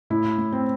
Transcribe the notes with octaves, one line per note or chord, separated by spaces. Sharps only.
A2 E4
A2
C4